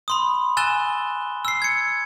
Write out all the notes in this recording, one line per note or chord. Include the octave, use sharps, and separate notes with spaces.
B5 C6 D#6
G#5 E6 F#6 A6 E7 G7
E6 C7
G#6 C#7